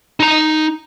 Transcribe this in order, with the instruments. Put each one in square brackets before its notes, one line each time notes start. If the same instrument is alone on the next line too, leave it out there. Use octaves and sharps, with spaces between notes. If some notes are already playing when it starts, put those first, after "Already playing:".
[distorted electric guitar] D#4 A#5